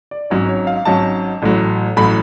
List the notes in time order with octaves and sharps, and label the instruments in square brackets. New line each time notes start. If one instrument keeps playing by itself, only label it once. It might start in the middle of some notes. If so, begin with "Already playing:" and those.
[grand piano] D5
G#1 G#2 F#3 C#4 C#5
C#5
F5
G#1 G#2 F#3 C#4 A5
A1 A2 F#3
A1 A2 F#3 B5